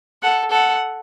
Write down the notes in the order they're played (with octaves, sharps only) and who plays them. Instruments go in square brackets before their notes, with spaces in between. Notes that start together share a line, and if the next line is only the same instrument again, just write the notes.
[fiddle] A4 [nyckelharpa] F#5
[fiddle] A4 [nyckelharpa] F#5